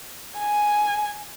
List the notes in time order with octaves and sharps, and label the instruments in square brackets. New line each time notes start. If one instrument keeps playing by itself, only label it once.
[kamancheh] G#5